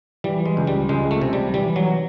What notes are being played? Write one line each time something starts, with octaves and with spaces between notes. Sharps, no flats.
E3 G3
G#3
C#2
G3
C#2 G#3
A3
C3
G3
E3 G3
F#3